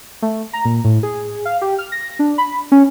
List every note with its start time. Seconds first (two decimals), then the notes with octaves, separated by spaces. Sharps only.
0.22 A3
0.53 A#5
0.65 A#2
0.84 A2
1.03 G#4
1.45 F5
1.62 G4
1.78 F6
1.92 A#6
2.19 D4
2.38 B5
2.72 C#4